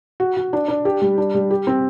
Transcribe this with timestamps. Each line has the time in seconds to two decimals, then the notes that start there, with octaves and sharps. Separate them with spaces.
0.20 F#4
0.37 F#4
0.53 D4
0.68 D4
0.85 G4
1.02 G3
1.18 D4
1.35 G3
1.51 G4
1.67 C4